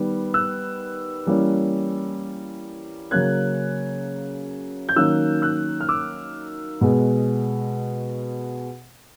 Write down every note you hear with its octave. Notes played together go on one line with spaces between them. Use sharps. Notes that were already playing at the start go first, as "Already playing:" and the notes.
Already playing: D#3 G3 B3
E6 F#6
E3 G3 A#3 C#4
C#3 F#3 A#3 C#4 F#6 G#6
G6
D#3 F#3 A#3 C#4 E6 F#6
E6 F#6
F6
D6 E6
B2 G#3 B3